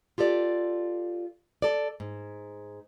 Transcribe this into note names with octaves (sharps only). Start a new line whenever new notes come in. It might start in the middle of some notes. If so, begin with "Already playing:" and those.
F4 G4 A4 D5
A4 D5
G#2